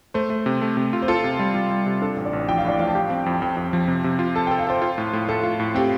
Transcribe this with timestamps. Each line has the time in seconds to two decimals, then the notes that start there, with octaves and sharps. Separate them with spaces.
0.14 A3 C5
0.30 A3
0.46 C3
0.62 A3
0.77 C3
0.93 F4
1.02 C5
1.08 F4 A4
1.24 C3
1.39 G3
1.55 G3
1.70 G3
1.86 C3
2.01 D4 A4
2.17 A1
2.25 D5
2.33 A1
2.48 F3 G5
2.58 F5
2.64 A2 D5
2.79 F3 F5
2.87 A5
2.95 G4 G5
3.10 C4
3.26 F2
3.42 F2 G5
3.57 F2
3.73 F3
3.88 C3
4.04 C3
4.19 F4
4.35 A4 A5
4.47 G5
4.51 A4
4.59 F5
4.67 A4 C5
4.82 F4
4.98 A2
5.13 A2
5.29 A2 A4
5.43 F4
5.60 A2
5.75 C4 G4